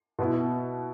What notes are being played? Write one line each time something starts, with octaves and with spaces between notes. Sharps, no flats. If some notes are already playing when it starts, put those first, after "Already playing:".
B2 B3 E4